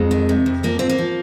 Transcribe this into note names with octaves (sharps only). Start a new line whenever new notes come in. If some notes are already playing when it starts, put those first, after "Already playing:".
Already playing: F2 G#3
D#3
C3
F2
F3 A#3
G#2 C4
A#3
F3